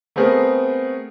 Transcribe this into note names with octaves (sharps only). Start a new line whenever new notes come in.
A3 B3 C4 G#4 A#4